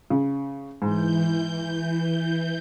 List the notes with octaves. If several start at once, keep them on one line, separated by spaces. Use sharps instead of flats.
C#3
G#2 E3 G6